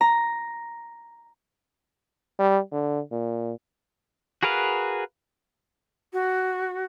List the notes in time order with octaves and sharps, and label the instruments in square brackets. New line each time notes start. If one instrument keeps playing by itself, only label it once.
[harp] A#5
[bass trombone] G3
D3
A#2
[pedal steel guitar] F#4 G#4 A#4 B4 F5
[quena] F#4